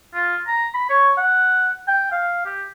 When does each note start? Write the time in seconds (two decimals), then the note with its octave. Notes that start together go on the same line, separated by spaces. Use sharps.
0.14 F4
0.47 A#5
0.74 B5
0.89 C#5
1.17 F#5
1.88 G5
2.12 F5
2.45 G4